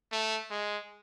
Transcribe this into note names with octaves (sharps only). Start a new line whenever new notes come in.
A3
G#3